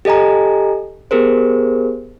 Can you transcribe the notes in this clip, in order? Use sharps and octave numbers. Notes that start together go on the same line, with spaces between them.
G4 A4 D#5 G#5 A#5
B3 G4 G#4 A#4 C5